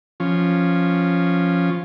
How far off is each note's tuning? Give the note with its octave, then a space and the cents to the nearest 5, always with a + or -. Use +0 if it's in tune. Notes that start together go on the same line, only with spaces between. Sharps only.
F3 +0 C#4 -5